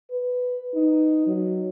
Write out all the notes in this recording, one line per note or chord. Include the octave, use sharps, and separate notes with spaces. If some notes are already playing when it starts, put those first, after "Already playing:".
B4
D#4
F#3